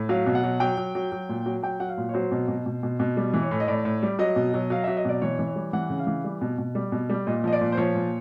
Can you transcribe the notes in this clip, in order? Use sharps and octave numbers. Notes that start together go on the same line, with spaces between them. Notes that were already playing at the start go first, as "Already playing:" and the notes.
Already playing: A2
F#3 F5
B2
F#5
F#3
F#3 G5
F#3
F#3
F#3
A#2
F#3
F#3 G5
F#3 F#5
F5
A#2
C#5
F#3 C5
B2
B2
B2
B2
B2
G3
E3
C#5
A2
D#5
A2 D5
A2
G3
F#3 D#5
B2
F#3
F#3 F5
F#3 E5
D#5
B2 D5
E3 C#5
E3
C#5
G3
E3 F#5
C#3
F5
E3
G3
B2
B2
G3
B2
G3
A#2 D#5
F3 D#5
D5
A#2
C5
F3 C#5
A#2